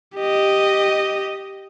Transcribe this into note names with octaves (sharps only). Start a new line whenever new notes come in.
G4 D#5